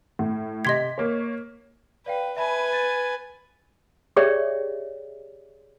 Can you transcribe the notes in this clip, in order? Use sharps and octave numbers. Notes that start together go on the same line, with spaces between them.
A2
C3 D#5 C6 G#6 B6
A#3 C#5
B4 D5 F5 G5
B4 E5 G#5 A5 B5
A6
G4 G#4 C#5 D5 E5 G5